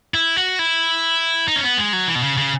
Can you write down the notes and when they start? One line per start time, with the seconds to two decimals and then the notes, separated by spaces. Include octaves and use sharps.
0.14 E4
0.37 F#4
0.59 E4
1.48 D#4
1.56 C#4
1.63 B3
1.78 G#3
1.93 F#3
2.08 E3
2.15 B2
2.23 C#3
2.37 C#3